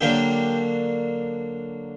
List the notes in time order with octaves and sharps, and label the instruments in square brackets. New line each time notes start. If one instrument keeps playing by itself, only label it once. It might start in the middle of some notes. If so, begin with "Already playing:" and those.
[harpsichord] D3 F#3 A#3 D4 G4